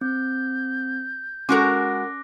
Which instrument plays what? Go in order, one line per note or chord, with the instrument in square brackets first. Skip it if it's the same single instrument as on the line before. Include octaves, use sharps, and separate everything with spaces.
[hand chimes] C4 [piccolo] G6
[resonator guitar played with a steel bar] G#3 F#4 A#4 [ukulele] C#4 A4 [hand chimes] D6 F#6 A#6